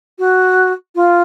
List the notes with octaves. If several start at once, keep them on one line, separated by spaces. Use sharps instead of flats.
F#4
F4